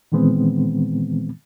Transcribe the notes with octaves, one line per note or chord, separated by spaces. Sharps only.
A#2 D#3 E3 G#3 B3 C4